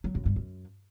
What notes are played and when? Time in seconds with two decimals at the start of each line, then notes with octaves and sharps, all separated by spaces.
0.04 F#3
0.15 F#2
0.25 G2
0.36 F#2